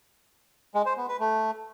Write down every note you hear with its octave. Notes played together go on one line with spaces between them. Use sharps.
G#3
C5
B3
B4
A3